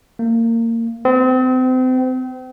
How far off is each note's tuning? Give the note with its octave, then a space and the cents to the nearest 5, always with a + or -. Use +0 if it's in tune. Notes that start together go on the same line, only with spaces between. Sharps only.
A#3 -25
C4 -35